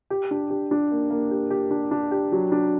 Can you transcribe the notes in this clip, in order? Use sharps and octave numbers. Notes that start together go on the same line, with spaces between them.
G4
D4
G4
D4
A#3
A#3
G4
G4
D4
D4
G4
F#3
D4